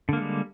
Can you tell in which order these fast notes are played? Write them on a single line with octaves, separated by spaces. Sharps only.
D3 A#3 G#3 G3